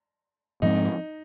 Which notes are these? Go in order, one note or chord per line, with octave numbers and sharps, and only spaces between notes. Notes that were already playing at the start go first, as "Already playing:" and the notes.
G#2 F3 G#3 C4 D#4